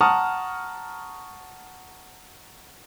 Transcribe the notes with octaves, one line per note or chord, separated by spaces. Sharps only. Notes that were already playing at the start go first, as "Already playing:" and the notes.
F#5 A5 A#5 C#6 D#6 F6